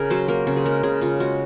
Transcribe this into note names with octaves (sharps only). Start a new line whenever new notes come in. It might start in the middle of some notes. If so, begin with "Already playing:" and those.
Already playing: C#3 G#4 A#4
F#3 C5
A#3 A#4
C#3 C5
G#4
G#3 A#4
C#3 G#4
C#3 F4
G#3 F#4